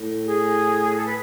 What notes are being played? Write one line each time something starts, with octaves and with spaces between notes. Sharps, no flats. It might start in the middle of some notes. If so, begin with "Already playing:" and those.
Already playing: A2
G#4
A4
B4